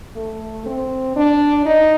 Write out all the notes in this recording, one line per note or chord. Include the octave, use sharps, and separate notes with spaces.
A3
C4
D4
D#4